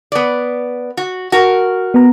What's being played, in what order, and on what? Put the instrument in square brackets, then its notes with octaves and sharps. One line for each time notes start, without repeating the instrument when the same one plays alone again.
[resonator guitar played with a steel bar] B3 D5
F#4
F#4 A#4
[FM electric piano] B3 A#5